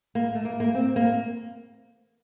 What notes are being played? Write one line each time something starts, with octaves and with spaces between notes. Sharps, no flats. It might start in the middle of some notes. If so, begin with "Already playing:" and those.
A#3
A3
A#3
A#3
C4
A#3